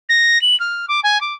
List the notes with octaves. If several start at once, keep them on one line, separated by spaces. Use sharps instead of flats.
A#6
F#7
F6
D6
G#5
D6